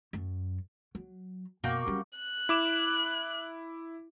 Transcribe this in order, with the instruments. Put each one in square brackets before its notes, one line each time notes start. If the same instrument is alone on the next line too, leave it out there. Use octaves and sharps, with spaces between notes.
[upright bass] F#2
F#3
[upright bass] F#2 [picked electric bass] B2 [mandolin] A#3 F#4 G5 [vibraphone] C#6 D6
[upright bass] F#3 C#4 [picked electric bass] G3
[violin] F#6
[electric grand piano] E4 D6 E7